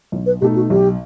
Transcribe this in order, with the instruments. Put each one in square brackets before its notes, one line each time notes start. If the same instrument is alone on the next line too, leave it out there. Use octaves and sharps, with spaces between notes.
[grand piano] B1
[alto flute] B4
[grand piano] B2 A3 D#4 A4 [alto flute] G4
[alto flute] F#4
[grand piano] B1 [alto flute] G4